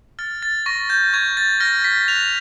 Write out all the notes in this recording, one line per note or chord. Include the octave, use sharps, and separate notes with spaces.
F6 A6
A6
C#6 A#6
G6
C#6 G#6
A6
F6 A#6
B6
F#6 F7